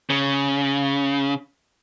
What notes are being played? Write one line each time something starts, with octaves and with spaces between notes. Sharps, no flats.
C#3